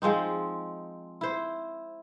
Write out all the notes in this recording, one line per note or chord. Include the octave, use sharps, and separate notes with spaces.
F3 G#3 C4 D#4
E4 C5